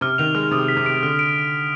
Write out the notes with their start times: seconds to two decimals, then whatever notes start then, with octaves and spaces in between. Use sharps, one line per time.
0.01 C3 F6
0.18 D#3 F7
0.35 G#3 F6
0.51 C3 D#6
0.68 B6
0.76 C3
0.86 D7
1.03 D3 F6
1.19 D7